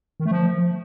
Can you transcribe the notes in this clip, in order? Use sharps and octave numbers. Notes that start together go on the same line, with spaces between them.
D#3
A3
F3